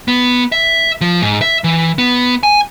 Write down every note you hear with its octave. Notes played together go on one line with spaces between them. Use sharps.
B3
E5
F3
G#2
E5
E3
B3
G#5